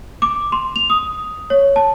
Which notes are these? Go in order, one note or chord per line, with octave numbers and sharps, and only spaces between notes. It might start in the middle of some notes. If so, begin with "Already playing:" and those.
D6
C6
F7
D#6
C#5
A5